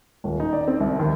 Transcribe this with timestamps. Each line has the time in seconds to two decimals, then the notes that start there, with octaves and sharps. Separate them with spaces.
0.24 D#1
0.40 D#4
0.53 D5
0.68 C4
0.80 C2
0.99 D#2